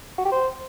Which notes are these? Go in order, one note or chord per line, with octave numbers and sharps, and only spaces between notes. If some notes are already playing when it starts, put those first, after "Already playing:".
F#4
G4
C5